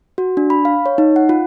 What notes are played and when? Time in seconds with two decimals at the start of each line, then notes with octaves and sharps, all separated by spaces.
0.18 F#4
0.37 D4
0.50 B5
0.65 F5
0.86 C#5
0.98 D#4
1.16 F#5
1.29 F4